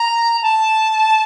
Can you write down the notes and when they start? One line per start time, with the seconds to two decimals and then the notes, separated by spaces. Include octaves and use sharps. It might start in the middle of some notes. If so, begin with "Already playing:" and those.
Already playing: A#5
0.43 A5